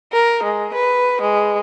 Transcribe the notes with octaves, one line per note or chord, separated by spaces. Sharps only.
A#4
G#3
B4
G#3